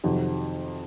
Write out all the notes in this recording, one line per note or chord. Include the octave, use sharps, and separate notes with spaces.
F2 C3 D#3 F#3